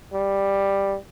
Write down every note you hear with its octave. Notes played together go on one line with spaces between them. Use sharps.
G3